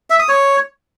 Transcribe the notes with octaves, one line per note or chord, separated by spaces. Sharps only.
E5
D#6
C#5